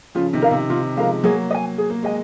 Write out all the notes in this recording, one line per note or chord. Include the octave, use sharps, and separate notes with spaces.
C#3 F3 F4
C3 D#3
A#4 F5
C3
C3 D#3 F4
F3 G#3 A#4 F5
F#3 A#3 G#4
D#5
G#5
G#4
A#3
G#3 D#5 G#5